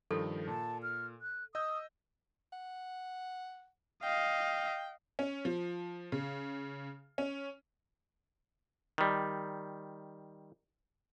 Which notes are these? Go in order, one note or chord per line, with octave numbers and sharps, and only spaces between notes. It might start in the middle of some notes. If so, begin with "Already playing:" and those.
G2 D#3 F3 A4
A#2 A5
F6
F#6
D#5 D#6 E6 G6
F#5
D#5 F5 G5
C#4
F3
C#3
C#4
D#3 G3